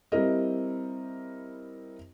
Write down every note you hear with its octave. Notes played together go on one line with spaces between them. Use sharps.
G3 C4 E4 A#4 D#5